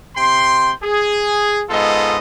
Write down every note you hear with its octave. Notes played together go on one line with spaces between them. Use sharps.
C3 G5 C6
G#4
G#2 B3 F4 A4 D#5